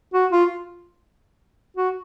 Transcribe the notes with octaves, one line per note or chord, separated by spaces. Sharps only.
F#4
F4
F#4